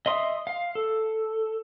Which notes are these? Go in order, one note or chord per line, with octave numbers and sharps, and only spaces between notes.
D#5 E5 C6 D#6
F5
A4